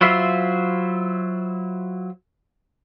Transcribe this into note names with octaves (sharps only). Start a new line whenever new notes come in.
F#3 E4 F4 C5 E5